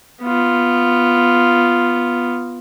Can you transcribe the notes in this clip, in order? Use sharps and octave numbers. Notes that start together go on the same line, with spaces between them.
B3 F4